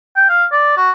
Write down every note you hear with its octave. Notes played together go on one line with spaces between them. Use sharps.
G5
F5
D5
F#4